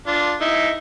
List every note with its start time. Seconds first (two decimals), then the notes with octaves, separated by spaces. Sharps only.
0.07 D4 F4
0.41 D#4 E4